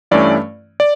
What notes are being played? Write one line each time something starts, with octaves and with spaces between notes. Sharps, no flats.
G2 E3 A3 C#4 D5
D5